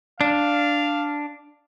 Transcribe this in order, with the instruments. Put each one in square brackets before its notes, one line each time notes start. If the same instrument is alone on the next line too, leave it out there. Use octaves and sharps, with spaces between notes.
[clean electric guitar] D4 [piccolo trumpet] F5